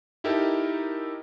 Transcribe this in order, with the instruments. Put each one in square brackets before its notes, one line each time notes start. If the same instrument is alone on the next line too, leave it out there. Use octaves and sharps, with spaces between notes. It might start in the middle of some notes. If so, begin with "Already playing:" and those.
[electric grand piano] D#4 E4 G4 A4 A#4 D#5